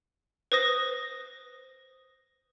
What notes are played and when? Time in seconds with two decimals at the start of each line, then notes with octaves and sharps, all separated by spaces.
0.52 B4 C5 D#6 A#6